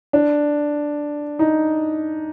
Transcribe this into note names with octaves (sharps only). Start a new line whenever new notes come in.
D4
D#4